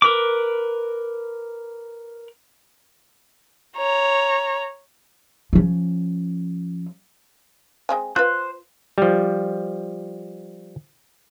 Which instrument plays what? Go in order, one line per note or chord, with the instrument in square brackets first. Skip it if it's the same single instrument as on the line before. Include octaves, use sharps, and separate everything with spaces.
[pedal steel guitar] A#4 B4 D6
[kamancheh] C#5 A#5
[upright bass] F3 C#4
[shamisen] G#3 C4 G#5
[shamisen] F4 B4 [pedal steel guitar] C5 F#6
[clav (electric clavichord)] F3 G3